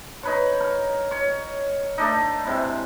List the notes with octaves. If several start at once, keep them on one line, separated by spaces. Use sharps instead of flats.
D#4 B4 C#5
A#4
C#5
A3 D4 D#4
G#2 C3 E4